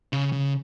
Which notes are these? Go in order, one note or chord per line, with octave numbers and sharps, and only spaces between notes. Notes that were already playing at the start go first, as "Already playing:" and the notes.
C#3
C#3